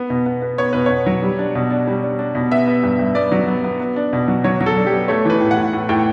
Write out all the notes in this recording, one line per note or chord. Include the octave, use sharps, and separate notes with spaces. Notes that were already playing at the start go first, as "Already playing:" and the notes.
Already playing: B3
B2
B3
B3
B3 C#5
B2 B4
B2 C#5
F#3
G3
D4
B2
D4
G3
D4
D4
B2
B3 E5
B3
G2
G2
B3 D5
F#3
B3
B3
B3
D4
B2
F#3
F#3 C#5
F#3
A4
D4
G4
B3
A3 C#5
E3 B4
A2
F#5
A2
A2
A2 G5